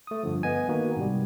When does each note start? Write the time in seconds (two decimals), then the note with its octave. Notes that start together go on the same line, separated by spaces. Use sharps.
0.07 A3 D#6
0.23 G2 D3 F3
0.43 B3 D#5 G#5
0.69 D#3 A#3 B3 D#4 F#4
0.97 G#2 C3 G3